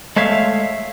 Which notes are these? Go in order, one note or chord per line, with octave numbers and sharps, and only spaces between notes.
G#3 A3 C#5 E5 F5